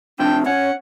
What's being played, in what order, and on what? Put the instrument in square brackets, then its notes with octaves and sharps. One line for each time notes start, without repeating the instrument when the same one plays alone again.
[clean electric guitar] C3 F3 [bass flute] D4 [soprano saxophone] G5
[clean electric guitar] C#4 [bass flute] C#5 [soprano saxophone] F#5